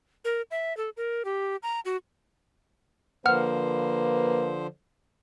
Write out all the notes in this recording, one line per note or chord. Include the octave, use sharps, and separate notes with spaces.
A#4
E5
A4
A#4
G4
A#5
F#4
D3 F3 A#3 B4 C5 F#5 F6